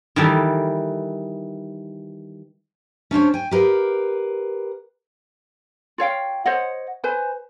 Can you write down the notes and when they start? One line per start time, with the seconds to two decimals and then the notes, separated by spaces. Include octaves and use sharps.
0.16 D#3 E3 G3 A4
3.11 C#4 D4 C5 C#5
3.34 G5 G#5
3.51 G4 A#4 B4 F5
5.98 F4 C#5 F5 G5
6.46 C5 C#5 D#5 F#5
7.04 B4 C5 G#5